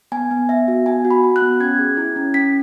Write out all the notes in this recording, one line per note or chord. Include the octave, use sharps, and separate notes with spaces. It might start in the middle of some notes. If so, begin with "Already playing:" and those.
B3 G#5
B3
B3 E5
F#4
B3 G#5
F#4
B5
F#4
F#6
B3
C#4 G#6
G#4
E4
C#4
C#4 B6